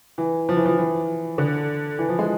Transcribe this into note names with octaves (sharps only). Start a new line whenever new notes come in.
E3
F3
E3
F3
E3
D3
E3
F3
G#3